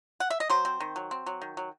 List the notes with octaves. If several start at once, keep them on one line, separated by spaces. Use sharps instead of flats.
F#5
E5
D#5
F#3 C5
C4
D#3
F#3
C4
F#3
D#3
F#3